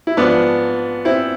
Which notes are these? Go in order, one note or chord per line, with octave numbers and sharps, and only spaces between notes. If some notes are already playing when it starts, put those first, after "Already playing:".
E4
G#2 F3 B3 D4
C4 E4